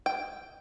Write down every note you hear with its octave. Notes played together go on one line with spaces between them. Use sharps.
G5